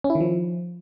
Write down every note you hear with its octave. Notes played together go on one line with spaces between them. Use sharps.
C#4
E4
D#3
F3